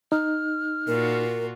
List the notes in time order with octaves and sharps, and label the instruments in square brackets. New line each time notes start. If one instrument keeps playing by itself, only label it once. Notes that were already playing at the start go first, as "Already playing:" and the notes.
[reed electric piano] D#4 [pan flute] F6
[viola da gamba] A#2 F4 F#4 [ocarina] A#4